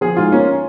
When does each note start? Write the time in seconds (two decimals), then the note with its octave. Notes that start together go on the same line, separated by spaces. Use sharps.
0.01 F3 G#4
0.17 G#2 F4
0.32 A#3 C#4